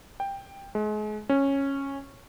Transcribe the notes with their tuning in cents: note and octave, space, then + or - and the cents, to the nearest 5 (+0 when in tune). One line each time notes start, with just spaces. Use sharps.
G5 +10
G#3 +35
C#4 -10